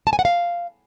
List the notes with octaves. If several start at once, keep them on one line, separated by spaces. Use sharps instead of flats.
A5
G#5
F#5
F5